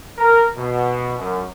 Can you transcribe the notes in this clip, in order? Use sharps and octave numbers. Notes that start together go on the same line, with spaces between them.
A#4
B2
F#2